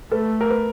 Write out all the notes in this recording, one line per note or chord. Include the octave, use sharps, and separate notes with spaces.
A3 A4 B4
A#4
B4